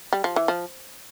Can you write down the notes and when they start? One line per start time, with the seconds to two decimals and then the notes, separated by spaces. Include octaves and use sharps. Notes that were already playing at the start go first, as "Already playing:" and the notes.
0.13 G3
0.24 F3
0.36 E3
0.48 F3